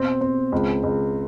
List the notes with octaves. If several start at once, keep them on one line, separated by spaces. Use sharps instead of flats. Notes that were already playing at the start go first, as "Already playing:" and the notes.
Already playing: B2 C4
C4
C#2
C#2